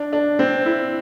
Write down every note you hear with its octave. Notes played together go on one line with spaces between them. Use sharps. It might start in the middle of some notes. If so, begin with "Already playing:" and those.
Already playing: D4
D4
C4
E4